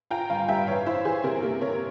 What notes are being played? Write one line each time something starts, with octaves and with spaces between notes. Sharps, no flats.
F4 G5 A#5
G2 F5 G#5
G3 E5 G5
E3 C#5 F5
E4 C5 E5
E3 G#4 C5
C3 G4 A#4
A#3 G4
C3 A#4 C#5